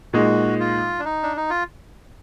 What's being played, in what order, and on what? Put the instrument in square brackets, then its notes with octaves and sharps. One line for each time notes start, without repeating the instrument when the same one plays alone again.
[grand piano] A#2 G#3 D#4 [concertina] F#4
[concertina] F4
D4
D#4
D4
D#4
F4